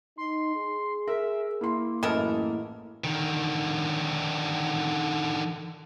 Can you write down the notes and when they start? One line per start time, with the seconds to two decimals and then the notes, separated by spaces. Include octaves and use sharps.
0.18 D#4 C6
0.55 G#4
1.07 A#4 E5
1.61 A#3 E4 C6
2.03 A1 F#2 G#3 E4 A4 A#4 F6
3.04 D3 D#3